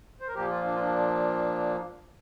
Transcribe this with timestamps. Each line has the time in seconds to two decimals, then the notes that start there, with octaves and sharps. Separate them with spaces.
0.21 C5
0.28 A#4
0.35 A#2 F3 A#3 G4
0.50 F4
0.65 D4
0.75 F4
0.79 D4